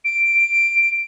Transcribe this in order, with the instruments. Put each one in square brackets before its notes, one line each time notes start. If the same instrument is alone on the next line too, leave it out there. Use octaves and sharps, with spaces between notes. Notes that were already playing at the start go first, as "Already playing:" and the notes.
[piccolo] D7